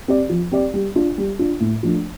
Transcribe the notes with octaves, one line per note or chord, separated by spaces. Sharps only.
C4 G4 D5
F3
C4 G4 D5
G3
D4 F4
G3
D4 F4
A2
F3 A3 D4